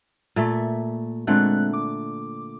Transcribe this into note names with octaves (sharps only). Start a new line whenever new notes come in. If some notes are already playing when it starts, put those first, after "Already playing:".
A#2 A3 E5
A#2 D3 G#3 A3 C4 F#6
D6